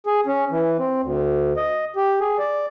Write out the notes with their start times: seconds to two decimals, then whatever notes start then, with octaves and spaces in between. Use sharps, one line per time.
0.06 G#4
0.26 C#4
0.51 E3
0.79 C4
1.02 D2
1.57 D#5
1.96 G4
2.21 G#4
2.39 D5